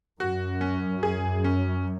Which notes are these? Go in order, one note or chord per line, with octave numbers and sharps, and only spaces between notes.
F#2 F#4
C#4
G#4
C#4